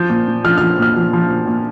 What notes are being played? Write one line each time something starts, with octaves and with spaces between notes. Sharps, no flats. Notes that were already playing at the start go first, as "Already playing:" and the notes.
Already playing: F3 G6
A#2
A#2
F3 F6
F6
F3
A#2 F6
F3
F3
A#2
A#2